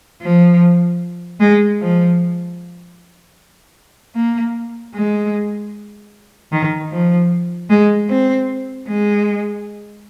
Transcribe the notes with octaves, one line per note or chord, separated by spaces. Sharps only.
F3
G#3
F3
A#3
G#3
D#3
F3
G#3
C4
G#3